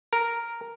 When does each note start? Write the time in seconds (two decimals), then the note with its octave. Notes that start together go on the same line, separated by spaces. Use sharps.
0.13 A#4